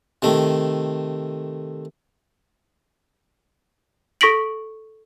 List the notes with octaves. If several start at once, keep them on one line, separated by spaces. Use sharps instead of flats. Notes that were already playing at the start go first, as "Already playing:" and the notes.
C3 D#3 A3
A4 C#6 A#6 B6 D7 F#7